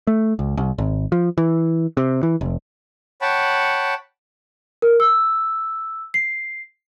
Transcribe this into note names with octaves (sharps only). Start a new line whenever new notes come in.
A3
C#2
C2
G#1
F3
E3
C3
E3
F1
C#5 F#5 G5 A5 B5
A#4
E6
C7